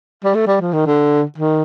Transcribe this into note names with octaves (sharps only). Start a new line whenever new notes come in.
G3
A3
G3
F3
D#3
D3
D#3